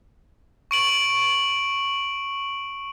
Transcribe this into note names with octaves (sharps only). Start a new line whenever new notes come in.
C#6 D7 F#7